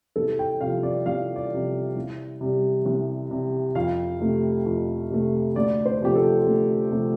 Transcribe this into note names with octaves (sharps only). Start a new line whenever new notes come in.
C2 A4
G5
C3 F3 F5
D5
C2 F5
D5
C3 F3
C2
C3 G3
C2
C3 G3
F2 F5
C3 A3
F2
C3 A3
D2 D5
C5
C3 F3 A3 G4
A4
D2
C3 F3 A3